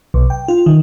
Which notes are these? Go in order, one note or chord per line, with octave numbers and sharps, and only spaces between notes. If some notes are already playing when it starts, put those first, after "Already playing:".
B1
G5
F4
D#3